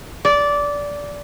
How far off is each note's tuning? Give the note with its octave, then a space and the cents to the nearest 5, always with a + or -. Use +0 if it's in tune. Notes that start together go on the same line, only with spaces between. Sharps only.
D5 -15